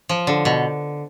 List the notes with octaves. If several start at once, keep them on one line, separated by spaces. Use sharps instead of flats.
F3
D3
B2